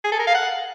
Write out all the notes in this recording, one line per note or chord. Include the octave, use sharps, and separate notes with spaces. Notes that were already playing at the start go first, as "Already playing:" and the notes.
G#4
A4
A#4
F5
F#5